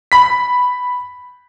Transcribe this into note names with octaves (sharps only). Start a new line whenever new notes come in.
B5 B6